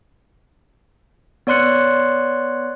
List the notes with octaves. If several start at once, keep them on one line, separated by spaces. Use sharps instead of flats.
B3 C#5 D5 C6 F#6 C#7